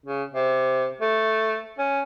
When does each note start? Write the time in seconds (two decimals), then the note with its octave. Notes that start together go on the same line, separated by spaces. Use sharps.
0.06 C#3
0.33 C3
1.01 A3
1.78 C#4